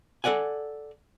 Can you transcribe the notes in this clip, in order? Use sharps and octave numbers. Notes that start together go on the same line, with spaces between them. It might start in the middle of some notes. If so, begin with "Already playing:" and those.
A4 A#4 D5 F#5 G#5